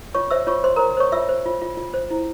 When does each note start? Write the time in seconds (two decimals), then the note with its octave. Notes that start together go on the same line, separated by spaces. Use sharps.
0.14 F4 C#5 C#6
0.31 C5 E5 E6
0.47 F4 C#5 C#6
0.64 C5 C6
0.76 A#4 C5 A#5
0.97 C5 C#5 C#6
1.12 F4 E5 E6
1.29 C5
1.46 F4
1.62 F4
1.77 F4
1.94 C5
2.10 E4